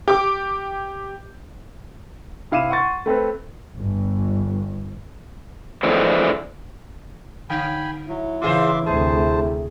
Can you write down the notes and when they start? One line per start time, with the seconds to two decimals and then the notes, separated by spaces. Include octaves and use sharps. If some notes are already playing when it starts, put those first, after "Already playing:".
0.08 G4 D6
2.51 C3 E4 F5 D6 D#7 E7
2.70 F#5 C6 C#6 A6
3.06 A3 C4 A4 B4
3.75 G1
5.83 D3 E3 F3 G#3 A3 C4
7.50 D3 G5 G#5 B5
8.09 F#3 E4
8.42 C#3 E3 F4 G#4 C5 E5 C6 D6
8.86 D2 C3 G#4 C5 A5